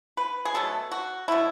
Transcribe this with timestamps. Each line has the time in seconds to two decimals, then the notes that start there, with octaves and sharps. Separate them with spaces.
0.17 B4
0.45 G#4
0.54 B2 F#3 A3 A4
0.92 F#4
1.28 B2 F#3 A3 E4